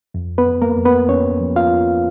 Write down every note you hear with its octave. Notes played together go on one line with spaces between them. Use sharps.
F2
B3 B4
F2
A#3 A#4
F2
B3 B4
F2 C#4 C#5
F3
F4 F5
F2